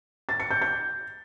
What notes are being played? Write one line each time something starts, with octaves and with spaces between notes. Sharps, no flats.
A6
C#7
G6
G6